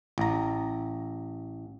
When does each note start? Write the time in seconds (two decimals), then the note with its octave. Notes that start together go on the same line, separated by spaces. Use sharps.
0.18 A1 A#5